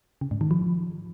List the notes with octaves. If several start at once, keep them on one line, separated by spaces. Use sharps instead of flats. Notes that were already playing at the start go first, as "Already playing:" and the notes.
C#3
G#2
D#3
F3